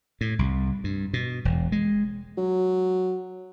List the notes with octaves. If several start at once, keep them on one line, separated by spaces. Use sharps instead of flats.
A2
C2
G2
B2
E1
G#3
F#3